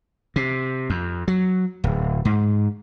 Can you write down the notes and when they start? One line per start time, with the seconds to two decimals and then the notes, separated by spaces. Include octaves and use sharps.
0.36 C3
0.90 F2
1.28 F#3
1.84 D1
2.25 G#2